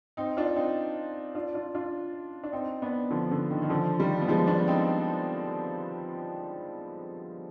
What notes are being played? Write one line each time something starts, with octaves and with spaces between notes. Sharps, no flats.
C4 D#4
D4 F4
C4 D#4
D4 F4
D4 F4
D4 F4
D4
C4 D#4
B3 D4
D3 F3
D3
D#3
D#3
D3 F3
D#3 G3
B3
F3 G#3
B3 D4
C4 D#4